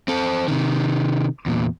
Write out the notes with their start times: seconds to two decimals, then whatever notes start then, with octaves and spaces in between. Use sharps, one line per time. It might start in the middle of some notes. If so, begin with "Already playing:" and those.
0.08 C4 A4
0.48 C3 D#3
1.46 E2 A#2